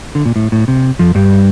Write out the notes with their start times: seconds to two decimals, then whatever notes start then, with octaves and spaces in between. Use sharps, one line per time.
0.15 D3
0.26 A#2
0.36 A2
0.52 A2
0.68 C3
0.99 F2 F3
1.15 G2 G3